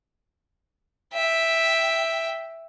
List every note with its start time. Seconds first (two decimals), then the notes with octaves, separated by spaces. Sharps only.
1.14 E5 G5